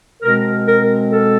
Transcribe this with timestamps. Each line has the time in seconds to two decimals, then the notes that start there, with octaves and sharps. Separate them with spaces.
0.22 B2 G#3 C4 A#4
0.67 A#4
1.13 A4